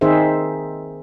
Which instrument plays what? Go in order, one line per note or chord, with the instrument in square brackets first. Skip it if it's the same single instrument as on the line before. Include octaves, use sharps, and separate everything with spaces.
[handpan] D#3 C4 D#4 G#4 C5 E5